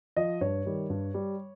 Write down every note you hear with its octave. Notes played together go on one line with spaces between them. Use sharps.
F3 D#5
G2 C#5
D#3 G3
G2
G3